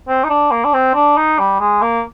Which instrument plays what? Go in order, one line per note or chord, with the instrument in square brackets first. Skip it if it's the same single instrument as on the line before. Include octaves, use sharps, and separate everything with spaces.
[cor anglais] C4
D#4
D4
A#3
D4
C4
D4
D#4
G3
G#3
A#3